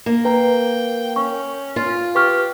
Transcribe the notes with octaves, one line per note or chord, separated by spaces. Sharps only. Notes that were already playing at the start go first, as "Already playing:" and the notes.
A#3
B4 G5 A#5
C#4 C#6
F4
G4 B4 C#6 F6